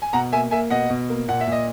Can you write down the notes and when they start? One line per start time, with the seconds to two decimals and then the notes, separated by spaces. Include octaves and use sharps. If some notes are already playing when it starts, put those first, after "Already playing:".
0.02 G#5
0.13 B2 F#5 A#5
0.32 A#3 E5 G#5
0.51 A#3 E5 G#5
0.70 B2 D#5 F#5
0.90 B2
1.09 A#3
1.28 A#2 F#5
1.41 E5
1.47 A#2 D#5